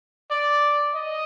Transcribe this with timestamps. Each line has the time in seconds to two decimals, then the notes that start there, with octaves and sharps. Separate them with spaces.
0.31 D5
0.95 D#5